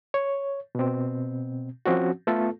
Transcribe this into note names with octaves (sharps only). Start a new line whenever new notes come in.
C#5
B2 C4
F3 C4 C#4 F#4
A3 B3 F4 A4